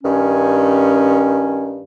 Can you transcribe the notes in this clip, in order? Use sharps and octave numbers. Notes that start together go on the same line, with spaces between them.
G2 D#3 C#4